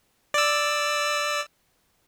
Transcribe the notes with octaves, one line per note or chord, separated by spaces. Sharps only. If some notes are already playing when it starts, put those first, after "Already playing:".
D5 E6